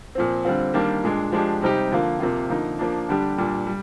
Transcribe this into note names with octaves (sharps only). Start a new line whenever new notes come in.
A#2 F3 C4
D3 G3 C4 F4
D#3 G3 A#3 D4
A#2 G#3 D4
F3 G#3 D4 G4
C3 G3 C4 D#4 G4
D3 F3 A#3 F4
C3 F3 A#3 F4
D3 F3 A#3 D#4
F3 A#3 D4
D3 G3 D4 G4
A#2 G3 D4
G3